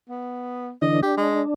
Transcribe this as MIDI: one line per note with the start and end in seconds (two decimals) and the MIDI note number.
0.09 0.72 59
0.82 1.02 50
0.82 1.02 52
0.82 1.02 62
0.82 1.00 75
1.03 1.54 62
1.03 1.15 67
1.17 1.41 56